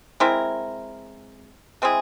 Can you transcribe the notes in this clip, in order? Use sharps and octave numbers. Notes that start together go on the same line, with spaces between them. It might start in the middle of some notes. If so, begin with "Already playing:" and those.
G#3 C4 E4 A#4
G#3 C4 E4 G#4